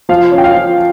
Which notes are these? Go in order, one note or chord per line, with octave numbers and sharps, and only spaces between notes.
F3 F5
C#4
G5
F5
F3